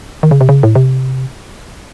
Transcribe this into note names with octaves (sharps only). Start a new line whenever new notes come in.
D#3
C#3
C3
C#3
A2
C3